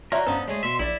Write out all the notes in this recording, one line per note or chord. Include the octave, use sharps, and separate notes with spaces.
F4 F#4 A#4 C#5 D5 E5 A#5 C#6
G2 B3 C#4 D#4 A4 C5 F5
G#3 A3 G#4 C#5
B2 E5 C6
A#1 E4 D5 A6